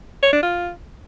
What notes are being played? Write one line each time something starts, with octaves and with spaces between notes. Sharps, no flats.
C#5
D4
F4